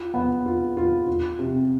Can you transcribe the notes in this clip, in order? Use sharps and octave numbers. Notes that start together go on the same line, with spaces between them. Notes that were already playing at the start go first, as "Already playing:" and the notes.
Already playing: F4
B3
F4
F4
F4
C3